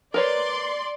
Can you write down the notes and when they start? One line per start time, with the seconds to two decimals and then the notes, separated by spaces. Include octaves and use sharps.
0.14 A#4 B4 C#5 D5 C6